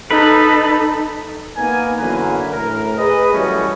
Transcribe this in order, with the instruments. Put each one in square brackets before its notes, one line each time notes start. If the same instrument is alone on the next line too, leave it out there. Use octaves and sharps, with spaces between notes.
[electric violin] D#4 A4 [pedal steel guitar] B4
[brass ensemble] A#3 B3 D#4 A#4 G#5
F#2 D3 E3 A#3 B4 G#5
A2 A#4
G#4 B4 D#5
E3 F#3 G3 A3 C#4